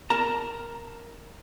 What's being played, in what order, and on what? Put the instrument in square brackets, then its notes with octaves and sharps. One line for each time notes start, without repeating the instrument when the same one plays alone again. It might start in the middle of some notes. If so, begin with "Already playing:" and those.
[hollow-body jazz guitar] A#4 A5 A#5